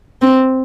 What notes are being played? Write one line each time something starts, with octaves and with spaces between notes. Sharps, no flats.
C4